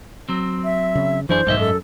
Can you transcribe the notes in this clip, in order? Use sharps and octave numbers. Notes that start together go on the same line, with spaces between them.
F#3 C4
E5
C#3
F#2 E3 D4 E4 G#4 C5
B1 G#2 D#3 D#5 E5
F#2 A4